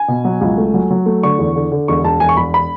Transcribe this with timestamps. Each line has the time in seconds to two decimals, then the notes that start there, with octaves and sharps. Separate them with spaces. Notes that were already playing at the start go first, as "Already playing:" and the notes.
Already playing: G#5
0.08 B2
0.25 F#3
0.41 C#2
0.57 A3
0.74 F#3
0.91 F#3
1.06 A3
1.23 D3 C#6
1.39 E2
1.55 D3
1.71 D3
1.88 E1 C#6
2.04 E1 A5
2.20 E1 G#5
2.29 C#6
2.37 E1 B5
2.54 B5